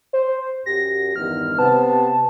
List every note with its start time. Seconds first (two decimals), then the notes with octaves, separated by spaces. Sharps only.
0.13 C5
0.66 F#2 G4 A#6
1.16 E2 G2 D#3 F6
1.59 C3 B3 A5